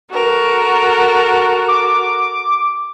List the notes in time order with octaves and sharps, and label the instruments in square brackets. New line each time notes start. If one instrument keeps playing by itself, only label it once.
[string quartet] F#4 A4 A#4
[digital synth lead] D6